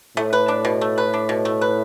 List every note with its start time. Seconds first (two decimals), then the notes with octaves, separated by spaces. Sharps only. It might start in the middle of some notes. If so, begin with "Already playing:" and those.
0.17 A2 A3
0.33 B4
0.48 D4
0.65 B2
0.81 A3
0.98 B4
1.14 D4
1.29 B2
1.45 A3
1.61 B4